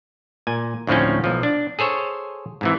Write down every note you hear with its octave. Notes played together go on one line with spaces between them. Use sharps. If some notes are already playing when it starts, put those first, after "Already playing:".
A#2 G#5
D2 A2 F3 C4 C#4
B1 F3
D4
G#4 A4 C5 C#5
G#2 C3 E3